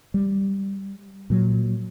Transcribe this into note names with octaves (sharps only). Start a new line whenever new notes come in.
G3
A#2 F#3